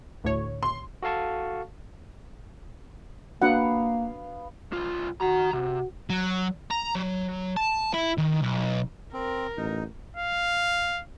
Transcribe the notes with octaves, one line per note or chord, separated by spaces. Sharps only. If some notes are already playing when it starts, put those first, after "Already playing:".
D2 A2 C#5
C6
F#4 A4 F5 A5 C#6
A#3 B3 D4 F#4 F5 F#5
C2 F4
D#3 F#4 A#5
C3 F#4
F#3
A#5
F#3
A5
E4
D#3
B1
C4 A#4
A1 D#4
F5